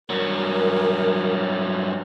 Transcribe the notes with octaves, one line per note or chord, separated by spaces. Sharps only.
G2 F#3 A#4